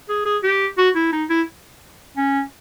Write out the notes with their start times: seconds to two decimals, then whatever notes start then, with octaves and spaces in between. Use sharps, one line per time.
0.09 G#4
0.25 G#4
0.43 G4
0.78 F#4
0.95 E4
1.12 D#4
1.30 E4
2.17 C#4